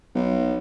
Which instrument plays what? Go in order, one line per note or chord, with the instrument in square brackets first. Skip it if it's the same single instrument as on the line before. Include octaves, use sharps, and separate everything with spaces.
[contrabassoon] B1